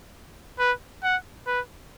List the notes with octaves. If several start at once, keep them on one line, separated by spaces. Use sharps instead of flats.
B4
F#5
B4